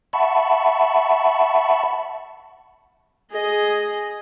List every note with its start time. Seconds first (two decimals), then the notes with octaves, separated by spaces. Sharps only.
0.13 E5 F#5 A5 B5 C#6
3.33 G#4 D#5